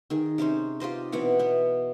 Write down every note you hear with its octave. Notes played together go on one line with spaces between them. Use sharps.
D#3 G#4
C3 C#4 D#4 C5
F4 G4 C5 D#5
B2 E3 C4 F#5
B3 E5